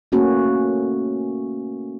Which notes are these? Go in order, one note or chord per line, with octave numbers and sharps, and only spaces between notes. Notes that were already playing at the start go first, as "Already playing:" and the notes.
A3 A#3 C#4 F#4